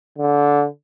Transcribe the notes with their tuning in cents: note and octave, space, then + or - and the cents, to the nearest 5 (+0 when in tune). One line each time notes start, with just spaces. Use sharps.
D3 -20